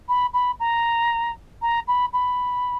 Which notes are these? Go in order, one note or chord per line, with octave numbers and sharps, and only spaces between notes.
B5
B5
A#5
A#5
B5
B5